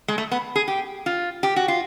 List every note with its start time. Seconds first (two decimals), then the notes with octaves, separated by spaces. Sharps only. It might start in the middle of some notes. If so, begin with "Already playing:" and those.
0.08 G#3
0.18 A3
0.31 B3
0.56 G#4
0.68 G4
1.06 F4
1.43 G4
1.56 F#4
1.68 F4